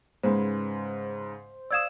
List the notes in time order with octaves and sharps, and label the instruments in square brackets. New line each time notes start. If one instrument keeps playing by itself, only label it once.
[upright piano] G#2 C#3 [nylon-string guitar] G#3 B4 [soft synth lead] C5
[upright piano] D5 F5 D#6 [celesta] E6 G#6 E7